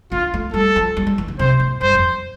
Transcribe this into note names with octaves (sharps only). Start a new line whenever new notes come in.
D4 F4
A3
G3 A4
F3
G3
G3
E3
D3
C3 C5
A2
G2 C5
F2